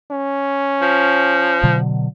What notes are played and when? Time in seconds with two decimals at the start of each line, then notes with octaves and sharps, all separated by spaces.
0.11 C#4
0.81 F3
1.63 B2 D3 F#3